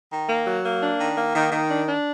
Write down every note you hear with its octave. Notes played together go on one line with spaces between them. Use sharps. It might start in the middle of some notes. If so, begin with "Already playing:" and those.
D#3
A#3
F#3
A#3
D4
D#3
A#3
D#3
D#3
D4
D4